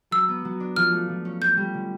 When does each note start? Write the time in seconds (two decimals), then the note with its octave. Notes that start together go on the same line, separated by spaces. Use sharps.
0.11 F#3 E6
0.28 B3
0.45 F#3
0.60 D4
0.76 F3 F6
0.92 A3
1.09 F3
1.25 C#4
1.41 C#4 G6
1.57 G3
1.74 D3